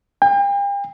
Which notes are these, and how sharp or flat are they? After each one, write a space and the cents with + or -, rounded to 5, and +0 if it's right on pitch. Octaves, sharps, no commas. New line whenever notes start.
G5 +40